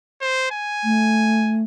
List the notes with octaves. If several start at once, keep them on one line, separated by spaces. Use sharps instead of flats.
C5
G#5
A3